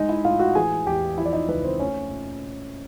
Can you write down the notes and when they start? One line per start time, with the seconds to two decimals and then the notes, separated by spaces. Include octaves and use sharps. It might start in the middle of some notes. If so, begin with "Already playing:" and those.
Already playing: G#3 D#4 D#5
0.09 E4 E5
0.25 A2 F4 F5
0.39 F#4 F#5
0.55 E3 G#4 G#5
0.86 E2 G4 G5
1.18 F3 E4 E5
1.26 D5
1.33 D#4 D#5
1.48 C#2 B4
1.64 C4 C5
1.79 A3 C#4 C#5
2.11 A#2